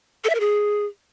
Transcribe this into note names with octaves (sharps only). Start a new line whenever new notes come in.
A4
E5
A#4
G#4